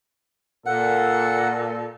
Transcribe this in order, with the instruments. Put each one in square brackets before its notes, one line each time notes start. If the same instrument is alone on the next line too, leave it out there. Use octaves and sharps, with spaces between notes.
[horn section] A#2 A4 [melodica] F#5